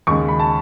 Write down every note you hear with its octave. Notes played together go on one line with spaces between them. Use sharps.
D#2 C#3 G#3 C#6
B5
A5